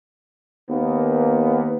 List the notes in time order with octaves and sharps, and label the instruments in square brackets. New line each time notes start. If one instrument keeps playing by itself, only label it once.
[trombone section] D#2 A#3 B3